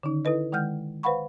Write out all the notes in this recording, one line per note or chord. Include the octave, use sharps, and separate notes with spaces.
D3 D#3 C#4 D#4
E4 A4 B4 D#5
D#3 G#3 F#5 F6 G6
B4 C5 F5 F#5 B5 C#6